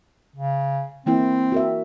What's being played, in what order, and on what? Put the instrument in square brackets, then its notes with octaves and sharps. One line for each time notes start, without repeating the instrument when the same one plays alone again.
[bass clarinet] C#3
[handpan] E3 A#3 E4 [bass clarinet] C4
[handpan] F#4 A#4 E5